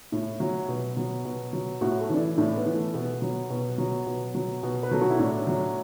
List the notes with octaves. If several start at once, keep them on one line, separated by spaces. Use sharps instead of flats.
A2
F#3
B2
F#3
B2
F#3
A2 F#4
A4
E3 D4
E4
A2 D4
B3
E3
A3
B2 B3
F#3
B2
F#3
B2
F#3
B2
B4
F#3 A4
F#4
E4
A2 D4
F#3